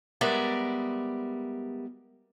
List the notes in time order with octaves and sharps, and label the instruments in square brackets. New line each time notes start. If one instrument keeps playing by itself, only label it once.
[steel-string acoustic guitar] G3 G#3 B3 A#4 D5 E5